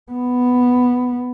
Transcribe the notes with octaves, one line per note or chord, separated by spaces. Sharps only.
B3